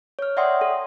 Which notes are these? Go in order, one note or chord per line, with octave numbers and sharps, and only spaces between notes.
C#5 F6
D5 E5 F#5 G5 C6 D#6
A4